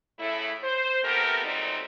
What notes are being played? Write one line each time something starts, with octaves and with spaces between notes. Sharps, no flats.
A2 C#3 A3 E4
C5
A3 B3 C4 G4 A#4
F#2 A#2 G3 A3 C4 D#4